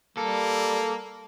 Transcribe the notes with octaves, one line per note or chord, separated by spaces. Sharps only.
G3 A#3 A4